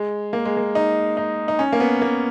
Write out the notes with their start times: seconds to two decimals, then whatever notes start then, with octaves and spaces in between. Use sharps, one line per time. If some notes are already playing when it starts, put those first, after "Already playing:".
Already playing: G#3
0.33 A#3
0.45 G#3
0.57 A#3
0.75 D#4
1.17 D#4
1.48 D#4
1.59 C#4
1.72 A#3
1.80 B3
2.01 A#3